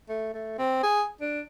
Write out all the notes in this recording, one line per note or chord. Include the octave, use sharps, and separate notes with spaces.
A3
A3
C4
G#4
D4